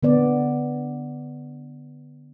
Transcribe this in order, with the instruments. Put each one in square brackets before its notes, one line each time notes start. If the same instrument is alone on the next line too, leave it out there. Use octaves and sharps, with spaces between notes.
[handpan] D3 B3 D5